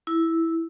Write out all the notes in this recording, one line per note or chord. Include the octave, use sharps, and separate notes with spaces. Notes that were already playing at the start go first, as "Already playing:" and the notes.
E4